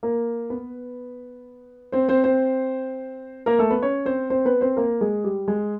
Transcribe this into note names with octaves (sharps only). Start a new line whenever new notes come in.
A#3 A#4
B3 B4
C4 C5
C4 C5
C4 C5
A#3 A#4
A3 A4
B3 B4
C#4 C#5
C4 C5
C4 C5
B3 B4
C4 C5
A#3 A#4
G#3 G#4
G3 G4
G#3 G#4